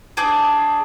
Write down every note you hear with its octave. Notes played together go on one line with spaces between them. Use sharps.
D4 G#4 D6 G6